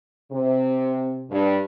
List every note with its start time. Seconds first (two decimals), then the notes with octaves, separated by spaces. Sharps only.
0.31 C3
1.30 G2